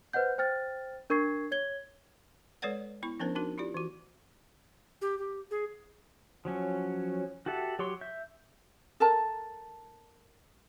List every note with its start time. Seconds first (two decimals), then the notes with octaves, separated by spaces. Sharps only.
0.13 B4 C5 D#5 F#5 G6
0.38 C5 G5 F6 A6
1.10 D4 A#4 C#6 G#6 C7
1.51 C#5 G#6 G7
2.62 G#3 A4 B4 C#5 D5 F#5
3.03 B3 E4 C#6
3.20 F3 B3 C#4 D4 A#4 C5
3.35 D4 D#4 F#4 A#4
3.58 E4 F4 G4 D5
3.74 E3 F#4
5.02 G4
5.19 G4
5.51 G#4
6.45 F3 F#3 C#4
7.46 F#4 G4 A4 E5 F#5
7.79 F#3 G4 C#5 C6
8.01 E5 G6
9.00 A4 A#4 A5